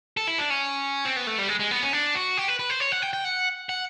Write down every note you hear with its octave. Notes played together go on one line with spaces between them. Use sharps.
A4
E4
D4
C#4
C4
B3
A3
G3
G#3
G#3
B3
C#4
D4
F#4
G4
B4
B4
C5
C#5
F#5
G5
G5
F#5
F#5